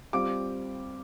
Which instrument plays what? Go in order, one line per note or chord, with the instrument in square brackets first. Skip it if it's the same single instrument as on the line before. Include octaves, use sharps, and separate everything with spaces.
[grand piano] G3 C4 F4 [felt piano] D6